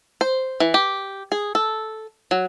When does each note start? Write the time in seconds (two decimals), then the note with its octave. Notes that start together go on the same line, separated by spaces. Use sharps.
0.21 C5
0.60 E3
0.74 G4
1.32 G#4
1.55 A4
2.31 F#3